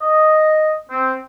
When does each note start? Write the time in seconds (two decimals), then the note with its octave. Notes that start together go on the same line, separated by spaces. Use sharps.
0.01 D#5
0.90 C4